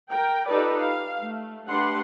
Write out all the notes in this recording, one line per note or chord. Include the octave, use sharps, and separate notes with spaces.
A#4 G5
D#4 F4 G4 A4 B4 D5
F5
A3
A3 D4 G4 B4 F#5 C6